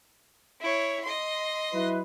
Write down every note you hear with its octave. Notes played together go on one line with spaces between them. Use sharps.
E4 C#5
D#5 C6
F#3 E4 B4